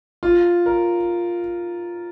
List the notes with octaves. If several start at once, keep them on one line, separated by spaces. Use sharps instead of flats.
F4
A#4